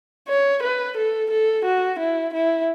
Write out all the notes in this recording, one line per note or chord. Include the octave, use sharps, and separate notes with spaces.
C#5
B4
A4
A4
F#4
E4
E4